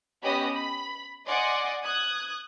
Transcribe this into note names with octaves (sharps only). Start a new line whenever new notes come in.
B3 C#4 G4 D#5 B5
B5
D5 D#5 F#5 G#5 C6
D#6 F#6 G#6